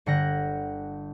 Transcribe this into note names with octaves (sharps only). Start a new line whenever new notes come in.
G1 D3 F#5 G5 A#6